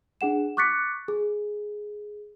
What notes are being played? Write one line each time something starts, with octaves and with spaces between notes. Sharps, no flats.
D4 G#4 F#5 E7
C#6 D6 F#6 A6 B6 C#7
G#4